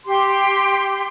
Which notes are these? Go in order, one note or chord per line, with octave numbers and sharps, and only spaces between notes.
G4 C6